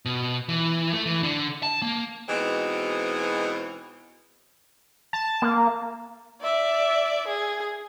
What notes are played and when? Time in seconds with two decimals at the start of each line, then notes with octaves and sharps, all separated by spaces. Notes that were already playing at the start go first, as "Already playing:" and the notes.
0.05 B2
0.49 E3
0.93 A3
1.06 E3
1.23 D3
1.63 A5
1.82 A#3
2.29 B2 E3 G#3 C4 D#4 F#4
5.13 A5
5.42 A#3
6.41 D5 E5
7.27 G#4